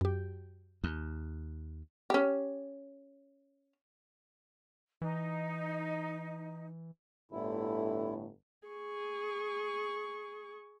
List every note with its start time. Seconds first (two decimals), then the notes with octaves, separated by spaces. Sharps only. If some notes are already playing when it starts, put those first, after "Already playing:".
0.01 F#2 G4
0.84 D#2
2.10 C#4 G4
5.02 E3 D#4
7.32 G1 A2 D3 E4
8.68 G#4 C#6